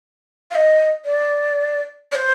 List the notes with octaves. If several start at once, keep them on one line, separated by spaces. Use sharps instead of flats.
F5
D#5
D5
D5
C5